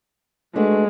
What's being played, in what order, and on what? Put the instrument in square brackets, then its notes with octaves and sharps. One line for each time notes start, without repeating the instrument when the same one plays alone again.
[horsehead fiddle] G#3 [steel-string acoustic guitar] A3 D4 F#4 B4